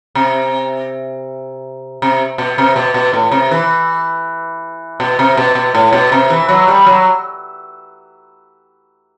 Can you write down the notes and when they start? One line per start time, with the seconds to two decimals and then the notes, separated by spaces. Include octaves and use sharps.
0.15 C3
2.02 C3
2.38 B2
2.58 C3
2.76 B2
2.94 B2
3.13 A2
3.32 C3
3.51 E3
5.00 B2
5.19 C3
5.37 B2
5.55 B2
5.75 A2
5.93 B2
6.12 C3
6.30 E3
6.49 F#3
6.68 G3
6.86 F#3